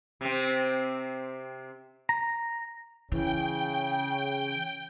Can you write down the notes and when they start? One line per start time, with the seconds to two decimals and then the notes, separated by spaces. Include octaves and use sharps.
0.21 C3 C4
2.09 A#5
3.12 C#3 E3 G5